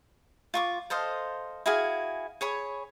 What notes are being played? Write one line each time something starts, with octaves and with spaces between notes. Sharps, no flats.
F4 C#6 D6
A4 C5 D#5 F5
E4 F#4 G#4 F5
G#4 C#5 B5